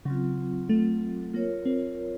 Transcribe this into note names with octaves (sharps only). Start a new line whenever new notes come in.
C#3 F#3 C4 F4
A3
A#3 F4 A#4 C#5
C4